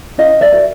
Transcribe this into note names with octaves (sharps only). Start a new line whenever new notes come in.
C#4 D#5 F5
D5 E5
F#4 A#4